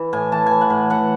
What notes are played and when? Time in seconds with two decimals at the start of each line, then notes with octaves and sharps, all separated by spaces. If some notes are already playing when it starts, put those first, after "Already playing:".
Already playing: E3
0.13 A2 G#5
0.32 E3 A5
0.46 E3 G#5
0.61 F#5
0.70 A2
0.90 E3 F#5